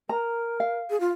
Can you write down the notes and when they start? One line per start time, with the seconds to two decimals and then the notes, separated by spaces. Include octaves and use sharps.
0.09 A#4 A#5
0.60 F5
0.90 G#4
1.00 F4